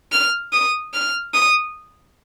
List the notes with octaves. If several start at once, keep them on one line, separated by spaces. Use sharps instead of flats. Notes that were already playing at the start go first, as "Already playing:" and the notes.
F6
D#6
F6
D#6